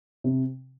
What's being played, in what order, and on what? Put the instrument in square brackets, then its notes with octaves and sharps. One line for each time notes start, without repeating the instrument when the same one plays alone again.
[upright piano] C3